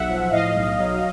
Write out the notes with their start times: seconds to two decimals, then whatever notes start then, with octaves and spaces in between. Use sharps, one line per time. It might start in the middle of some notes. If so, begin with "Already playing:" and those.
Already playing: B1 E5 F#5
0.09 F3
0.32 A2 D#5 F5
0.55 B1
0.79 F#3